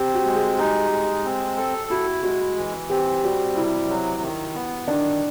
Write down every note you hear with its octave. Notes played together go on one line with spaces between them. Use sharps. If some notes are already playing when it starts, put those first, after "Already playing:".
Already playing: C4 G4
F#4
G#3
G#4
D#4 G4
G#3
C4
A4
E4 F#4
G#3 F#4
E3
C4 G4
G3 F#4
C3 E4
F#3
D#3
B3
D#3 D4